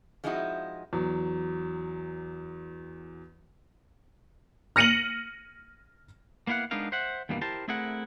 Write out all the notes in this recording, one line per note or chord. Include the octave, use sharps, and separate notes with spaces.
F3 G#3 C4 D#4 E4 F#4
E2 F#3
F6 A#6 C#7 D#7 F7 F#7
A#3 B3 E4 F5 F#5
G#3 B3 D4 D#4 A#4 F5
C5 E5 F#5
E2 G2 B2 G3 A3 A#3
E4 G4 A#4 C5 A5
A3 C4 E4 G#4 A#4 F#5